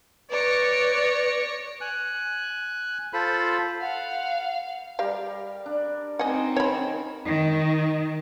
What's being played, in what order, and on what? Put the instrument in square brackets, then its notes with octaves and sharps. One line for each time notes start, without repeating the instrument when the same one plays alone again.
[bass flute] B4 [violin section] C#5 A#6 C#7 [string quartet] D5
[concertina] G#5 F#6
F4 A4 C5 B5
[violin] F5 [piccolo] F#5
[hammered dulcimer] G3 A#4 [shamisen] G4 F5
[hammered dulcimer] D4
[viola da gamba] C4 D#4 [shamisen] D#5 F#5 [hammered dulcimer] G#5
[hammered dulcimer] D#3 C5 [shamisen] C#5 B5
[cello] D#3